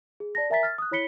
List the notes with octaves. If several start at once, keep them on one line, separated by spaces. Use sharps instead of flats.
G#4
D5 A5 A#6
A#4 E5 G#5 A#5 A6 B6
F6 A6
D#6 F#6
E4 C#5 B5 B6 C#7 G7